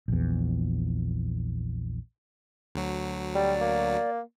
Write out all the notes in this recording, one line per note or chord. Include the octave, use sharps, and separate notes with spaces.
A#1 E2
D2 F#3
G3 D5
A#3